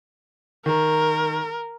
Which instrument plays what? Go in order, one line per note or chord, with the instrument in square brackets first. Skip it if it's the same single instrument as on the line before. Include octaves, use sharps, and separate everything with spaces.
[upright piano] D#3 [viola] A#4